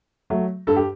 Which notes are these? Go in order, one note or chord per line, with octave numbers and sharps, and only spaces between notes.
F#3 A3
G2 A4
G4